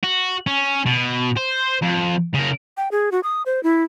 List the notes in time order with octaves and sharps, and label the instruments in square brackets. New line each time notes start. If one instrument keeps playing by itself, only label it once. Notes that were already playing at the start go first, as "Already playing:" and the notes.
[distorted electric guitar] F#4
C#4
B2
C5
F2
C#3 A#4
[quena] G5
G#4
F#4
D#6
C5
E4